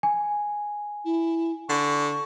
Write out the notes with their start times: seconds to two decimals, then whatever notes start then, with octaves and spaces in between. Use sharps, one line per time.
0.03 G#5
1.05 E4
1.69 D3 C#6